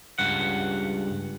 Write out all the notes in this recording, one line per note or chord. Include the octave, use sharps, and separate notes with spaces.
C#2 G2 F#5